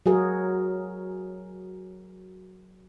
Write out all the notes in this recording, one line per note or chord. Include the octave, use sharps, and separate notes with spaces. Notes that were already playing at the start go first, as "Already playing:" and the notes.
F#3 F#4 G#4 A#4